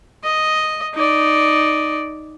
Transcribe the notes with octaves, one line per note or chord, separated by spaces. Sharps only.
D#5
D#4 D5